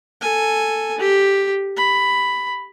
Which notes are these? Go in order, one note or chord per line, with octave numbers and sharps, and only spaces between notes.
A4 G#5
G4
B5